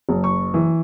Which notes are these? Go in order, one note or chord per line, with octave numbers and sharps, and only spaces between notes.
F#1
C#6
E3